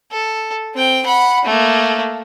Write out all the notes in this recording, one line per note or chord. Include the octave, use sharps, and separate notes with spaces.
A4
C4 G5
F#5 B5
A3 A#3